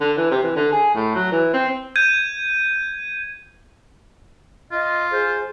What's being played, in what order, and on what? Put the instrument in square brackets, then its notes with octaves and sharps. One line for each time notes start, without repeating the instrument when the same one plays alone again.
[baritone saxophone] D3
E3
C3
E3
D3
G#4
A2
F#3
E3
C4
[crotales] G6 G#6 D#7
[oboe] F4 [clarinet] D#5
[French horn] G#4 [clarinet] C5